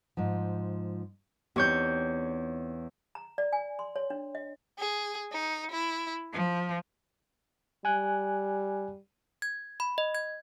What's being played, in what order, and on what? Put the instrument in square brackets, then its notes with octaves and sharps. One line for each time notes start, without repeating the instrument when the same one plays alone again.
[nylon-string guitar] G#2 F3
[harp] E2 C#5 G6 [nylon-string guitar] C4 D#4 G4
[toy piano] A#5
D5
G#5
C6
C#5
D4
D#5
[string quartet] G#4
D#4
E4
F3
[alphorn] G3 [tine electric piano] G#5 F#6
[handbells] G#6
B5
D#5
G#6